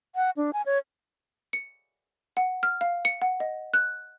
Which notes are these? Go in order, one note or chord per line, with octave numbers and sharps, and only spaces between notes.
F#5
D4
G#5
C#5
C#7
F#5
F6
F5
C#7
F#5
D#5
F#6